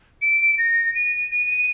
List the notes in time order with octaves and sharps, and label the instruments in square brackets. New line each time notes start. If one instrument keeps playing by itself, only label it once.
[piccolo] D7
A#6
D#7
D#7